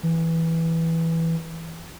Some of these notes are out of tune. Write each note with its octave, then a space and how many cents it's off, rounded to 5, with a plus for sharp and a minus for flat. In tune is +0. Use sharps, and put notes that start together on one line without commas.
E3 -5